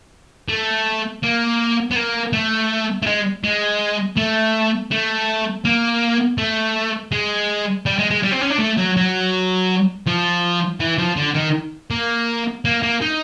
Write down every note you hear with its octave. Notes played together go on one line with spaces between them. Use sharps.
A3
A#3
B3
A#3
A3
A3
G#3
G#3
A3
A3
A#3
A3
G#3
G3
G#3
G#3
G3
C4
C#4
D4
A3
F#3
F#3
F3
E3
F3
D3
D#3
A#3
A#3
A#3
D#4